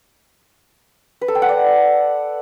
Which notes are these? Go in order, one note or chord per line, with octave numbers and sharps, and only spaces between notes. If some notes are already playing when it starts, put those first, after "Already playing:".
B4
A4
G5
F#5
D5